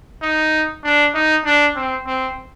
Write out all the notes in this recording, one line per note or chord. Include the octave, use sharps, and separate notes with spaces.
D#4
D4
D#4
D4
C4
C4